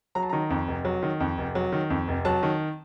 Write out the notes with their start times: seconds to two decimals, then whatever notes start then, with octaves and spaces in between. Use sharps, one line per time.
0.15 F#3 A#5
0.23 A5
0.29 D#3 A#5
0.50 F2
0.68 F1
0.85 F#3
1.03 D#3
1.20 F2
1.38 F1
1.55 F#3
1.72 D#3
1.90 F2
2.08 F1
2.25 F#3 A5
2.43 D#3